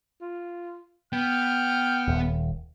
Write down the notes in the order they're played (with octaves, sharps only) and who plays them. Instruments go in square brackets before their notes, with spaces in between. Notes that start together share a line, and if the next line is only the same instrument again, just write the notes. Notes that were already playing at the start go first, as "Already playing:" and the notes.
[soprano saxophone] F4
[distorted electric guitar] B3 [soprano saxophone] G5 [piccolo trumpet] F6
[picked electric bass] D#1